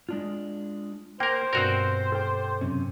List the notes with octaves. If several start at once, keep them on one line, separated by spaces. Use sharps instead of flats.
G#3 D4 F4
A#3 A#4 C5 G5
G2 B2 C4 F#4 A#4
A4 G5 D6 F6
F#2 C3 C#4